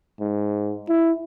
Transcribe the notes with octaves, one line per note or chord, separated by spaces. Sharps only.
G#2
E4